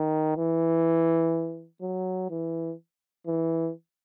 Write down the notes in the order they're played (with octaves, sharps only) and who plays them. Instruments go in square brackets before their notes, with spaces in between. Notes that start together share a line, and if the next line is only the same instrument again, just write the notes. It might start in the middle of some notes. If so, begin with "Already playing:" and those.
Already playing: [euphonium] D#3
E3
F#3
E3
E3